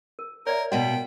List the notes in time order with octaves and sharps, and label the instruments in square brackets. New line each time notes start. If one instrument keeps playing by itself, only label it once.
[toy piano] A#4
[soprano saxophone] A#4 [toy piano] C#5 D5 E5
[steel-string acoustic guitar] B2 A#3 B3 [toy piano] F#4 D#5 F#5 [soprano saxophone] G5